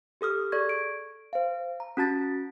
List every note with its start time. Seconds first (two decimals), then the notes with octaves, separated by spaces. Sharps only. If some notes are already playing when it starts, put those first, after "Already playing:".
0.21 G4 A4 D#6 F6
0.52 G#4 A4 D5 C#6 G#6
0.69 D7
1.33 C5 F5
1.80 A#5
1.97 C#4 F#4 A5 A6 B6